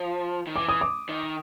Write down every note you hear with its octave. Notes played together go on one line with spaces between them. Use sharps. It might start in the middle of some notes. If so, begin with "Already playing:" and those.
Already playing: F3
D#3
E3 D6
D#6
D6
D#3